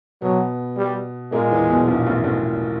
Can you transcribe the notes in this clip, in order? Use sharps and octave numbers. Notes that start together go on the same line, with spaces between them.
B2 F#3 B3
G3
A#2 G#3 A#3
E2 E3
B1 B2
A#1 A#2
A1 A2
A1 A2